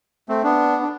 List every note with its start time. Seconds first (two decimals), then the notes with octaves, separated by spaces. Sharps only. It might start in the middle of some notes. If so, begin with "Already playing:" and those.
0.29 A3 C4
0.43 B3 D4
0.83 D4